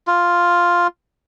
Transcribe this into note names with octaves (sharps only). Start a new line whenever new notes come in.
F4